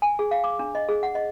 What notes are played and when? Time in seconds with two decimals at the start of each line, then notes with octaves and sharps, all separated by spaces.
0.02 G#5
0.19 G#4
0.31 F5
0.44 D6
0.59 D4
0.75 D#5
0.89 G#4
1.03 F#5
1.15 D#5